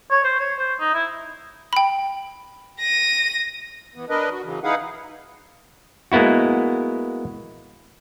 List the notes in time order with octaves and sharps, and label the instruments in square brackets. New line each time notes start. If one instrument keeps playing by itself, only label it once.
[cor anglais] C#5
C5
C#5
C5
D#4
E4
[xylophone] G5 B5
[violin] A#6 D#7
[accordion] E3 B3
D4 A#4 B4 D#5
F#4
C#3 E3 F#3
D#4 E4 G#4 B4 F5 F#5
[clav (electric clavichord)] G#3 A#3 B3 E4 F#4